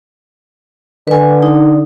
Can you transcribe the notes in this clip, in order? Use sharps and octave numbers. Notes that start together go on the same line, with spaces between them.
D3 B4 G#5
D#4